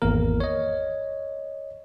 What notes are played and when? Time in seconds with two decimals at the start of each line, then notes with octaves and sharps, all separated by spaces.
0.02 G#1 E2 A#3 A#4
0.40 C#5 D#5